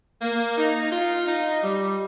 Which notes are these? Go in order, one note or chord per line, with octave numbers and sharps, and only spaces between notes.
A#3
D#4
F4
D#4
G3